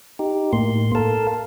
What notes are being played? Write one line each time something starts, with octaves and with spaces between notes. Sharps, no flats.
D#4 G4
A2 A#3 C6
A4 A#4 F5 A5